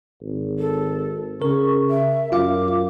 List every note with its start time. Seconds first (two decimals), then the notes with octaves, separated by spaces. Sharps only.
0.21 G#1
0.59 A4
1.42 C#3 A#4 C#6
1.90 E5
2.32 F#2 F4 F5 D6